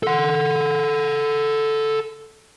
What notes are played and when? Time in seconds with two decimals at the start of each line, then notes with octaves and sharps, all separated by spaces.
0.03 A4 F#5